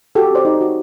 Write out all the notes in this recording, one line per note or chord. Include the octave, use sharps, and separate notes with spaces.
F#4 G4 A4
C4 C5 D5
D#4
F#4